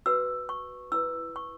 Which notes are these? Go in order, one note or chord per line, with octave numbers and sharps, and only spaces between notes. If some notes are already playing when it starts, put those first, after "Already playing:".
F#4 B4 E6
C#6
E4 B4 E6
C#6